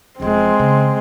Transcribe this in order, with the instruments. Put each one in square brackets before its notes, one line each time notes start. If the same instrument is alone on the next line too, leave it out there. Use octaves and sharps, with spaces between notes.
[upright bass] E1 F3 [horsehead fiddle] G#3 C4
[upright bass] C#3